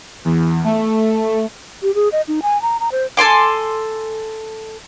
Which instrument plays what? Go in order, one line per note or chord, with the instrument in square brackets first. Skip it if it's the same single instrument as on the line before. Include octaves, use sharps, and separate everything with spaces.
[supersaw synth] E2
A3
[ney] G4
G#4
D#5
D#4
G#5
A#5
A#5
C5
[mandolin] A4 G#5 C6 D6